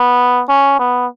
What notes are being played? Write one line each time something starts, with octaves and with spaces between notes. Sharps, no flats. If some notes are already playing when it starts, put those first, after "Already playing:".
Already playing: B3
C#4
B3